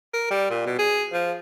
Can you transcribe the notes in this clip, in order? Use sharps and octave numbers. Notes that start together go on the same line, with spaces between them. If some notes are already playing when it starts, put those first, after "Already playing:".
A#4
G3
A#2
B2
G#4
F3